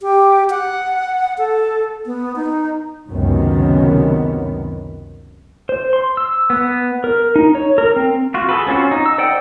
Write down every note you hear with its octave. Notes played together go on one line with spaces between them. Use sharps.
G4
F#5
A4
B3
D#4
C#2 F#2 C3 D#3 B3
C5
C6
E6
B3
A#4
D#4
C#5
A#4
C4
F4 F#4
G#4 A4 B4
C4 C#4 F4 F#4
D#4
E6
C5 D5 D#5 F#5 G5